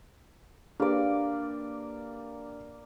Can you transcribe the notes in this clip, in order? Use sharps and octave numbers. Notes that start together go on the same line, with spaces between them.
A#3 D4 G4 B4 D5